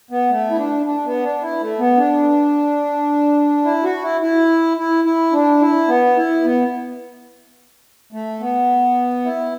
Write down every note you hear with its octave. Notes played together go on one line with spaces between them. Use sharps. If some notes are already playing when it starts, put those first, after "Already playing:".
B3
A3
E4
D4
D4
B3
D4
E4
A3
B3
D4
E4
F#4
E4
E4
E4
E4
D4
E4
B3
E4
B3
A3
B3
E4